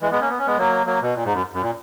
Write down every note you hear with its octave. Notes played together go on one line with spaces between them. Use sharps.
E3 G#3
G#3 B3
A#3 C#4
B3
C#4
G#3 B3
F#3 A#3
F#3 A#3
B2
A#2
G#2
F#2
F#2
A#2